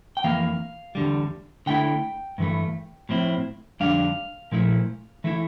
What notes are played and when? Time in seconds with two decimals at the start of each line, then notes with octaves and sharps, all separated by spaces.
0.17 G5
0.24 F2 E3 A#3 F5
0.95 E2 D3 G3
1.66 D3 A3 E4 G5
2.38 G2 E3 A3
3.09 A2 F3 C4 E4
3.80 F2 D3 G3 D4 F5
4.52 A#2 F3 A3 E4
5.24 E3 A3 E4